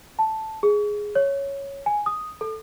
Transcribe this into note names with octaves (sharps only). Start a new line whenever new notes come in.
A5
G#4
C#5
G#5
D#6
A4